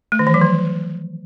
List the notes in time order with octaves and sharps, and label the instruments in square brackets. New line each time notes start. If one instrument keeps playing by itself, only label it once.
[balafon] A3
D#3
E3
F#3
F3